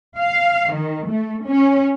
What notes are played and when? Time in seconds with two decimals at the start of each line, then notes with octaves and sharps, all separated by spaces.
0.18 F5
0.73 D#3
1.08 A3
1.46 C#4